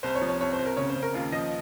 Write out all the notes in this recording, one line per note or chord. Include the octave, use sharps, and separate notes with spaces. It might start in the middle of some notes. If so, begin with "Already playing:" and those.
C2 C5
C#5
F3
C#5
C2 C#5
C5
C2
A#4
C#3 C#5
C5
C#3
A#4
D#2 F4
F3 D#5